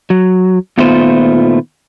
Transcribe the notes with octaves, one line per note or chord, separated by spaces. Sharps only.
F#3
A#2 D#3 A3 B3 F4 C5